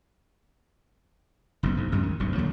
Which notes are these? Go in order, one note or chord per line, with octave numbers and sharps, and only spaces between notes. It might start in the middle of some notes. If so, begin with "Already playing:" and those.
F#1 B1 F2 B2
B1 G#2
A1 F#2 C#3 G#3
D#3
E1 B1 G2 C3
D#2 A#2 D3 F#3